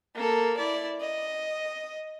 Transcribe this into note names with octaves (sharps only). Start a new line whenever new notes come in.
A#3 A4
E4 D5
D#5